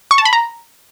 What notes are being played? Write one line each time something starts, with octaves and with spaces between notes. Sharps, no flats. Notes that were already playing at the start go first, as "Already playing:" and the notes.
C#6
A5
B5
A#5